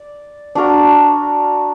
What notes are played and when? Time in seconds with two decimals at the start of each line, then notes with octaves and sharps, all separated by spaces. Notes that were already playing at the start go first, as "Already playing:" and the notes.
Already playing: D5
0.55 D4 F#4 A#4